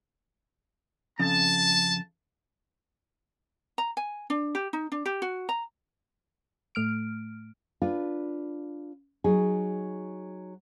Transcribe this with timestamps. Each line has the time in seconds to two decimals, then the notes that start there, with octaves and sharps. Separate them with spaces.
1.20 F2 C#3 A5
3.78 A#5
3.97 G#5
4.30 D4
4.55 G4
4.73 D#4
4.92 D4
5.06 G4
5.22 F#4
5.49 A#5
6.75 A2 A3 F6 D7
7.82 D4 F4 B4
9.24 F#3 D#4 G#4